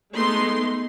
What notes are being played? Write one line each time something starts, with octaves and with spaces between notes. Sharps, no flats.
G#3 A3 B3 D#4 C6